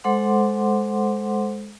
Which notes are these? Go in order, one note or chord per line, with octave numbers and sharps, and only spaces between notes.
G#3 A4 C5 F#5 C6 D6